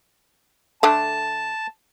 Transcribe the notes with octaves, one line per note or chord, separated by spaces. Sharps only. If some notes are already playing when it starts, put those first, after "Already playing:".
D3 A3 D4 A5